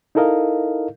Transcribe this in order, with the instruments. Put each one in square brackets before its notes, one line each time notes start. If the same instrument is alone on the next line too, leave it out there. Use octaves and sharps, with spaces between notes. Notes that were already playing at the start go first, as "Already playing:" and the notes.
[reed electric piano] D#4 E4 A4 A#4 D#5 F5